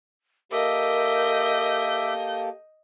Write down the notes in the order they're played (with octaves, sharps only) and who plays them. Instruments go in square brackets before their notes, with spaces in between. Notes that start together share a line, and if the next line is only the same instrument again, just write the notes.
[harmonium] A#3 G4 A4 [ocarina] A#4 [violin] D#5 G6 [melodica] E5 D6